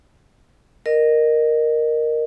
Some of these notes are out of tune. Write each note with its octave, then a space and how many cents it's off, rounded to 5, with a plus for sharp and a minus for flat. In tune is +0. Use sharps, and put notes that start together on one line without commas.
A#4 +0 D#5 -20